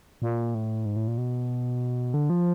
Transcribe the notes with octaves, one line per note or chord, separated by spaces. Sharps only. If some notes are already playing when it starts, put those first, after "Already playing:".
A#2
A2
G#2
A2
A#2
B2
D3
F3